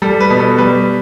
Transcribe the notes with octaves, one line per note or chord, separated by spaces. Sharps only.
G3 A4
B4
B2
A4
G3 B4